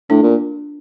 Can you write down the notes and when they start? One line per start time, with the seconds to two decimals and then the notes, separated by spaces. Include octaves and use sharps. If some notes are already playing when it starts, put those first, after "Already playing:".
0.10 A2 D4
0.23 A#2